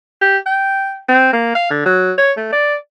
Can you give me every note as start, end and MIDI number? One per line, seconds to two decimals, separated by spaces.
0.22 0.37 67
0.46 0.99 79
1.09 1.31 60
1.33 1.51 58
1.55 1.70 77
1.70 1.83 50
1.86 2.12 54
2.18 2.32 73
2.37 2.49 57
2.53 2.75 74